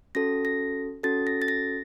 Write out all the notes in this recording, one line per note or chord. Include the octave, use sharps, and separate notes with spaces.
C#4 F#4 A4 A#6
A#6
C#4 F#4 A4 A6
A#6
A6
A#6